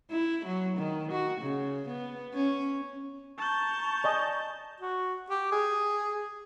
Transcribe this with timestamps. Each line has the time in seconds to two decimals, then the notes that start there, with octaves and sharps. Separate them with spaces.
0.10 E4
0.46 F#3
0.77 D#3
1.12 F#4
1.41 C#3
1.88 B3
2.34 C#4
3.38 A5 A#5 C#6 G6
4.04 D5 D#5 G#5
4.80 F#4
5.30 G4
5.52 G#4